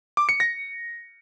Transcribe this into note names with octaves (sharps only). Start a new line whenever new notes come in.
D6
C#7
A#6